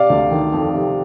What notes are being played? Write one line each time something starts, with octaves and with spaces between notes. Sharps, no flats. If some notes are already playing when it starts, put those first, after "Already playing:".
Already playing: C3 D5 F5
D2
D#3
F2
C3